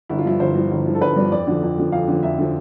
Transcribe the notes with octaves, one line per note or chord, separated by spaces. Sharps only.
G1 E4
F4
G2 F3 E4
G1 C5
G2 F3
G1
G2 F3
A4
G1 B4
G2 F3 D5
F2 D5
D3 F3
F2
D3 F3
F2 F5
D3 F3
F2 E5
D3 F3